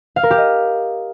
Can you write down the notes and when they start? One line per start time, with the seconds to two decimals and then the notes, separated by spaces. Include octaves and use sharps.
0.16 F5
0.23 A#4
0.31 G4
0.38 D#5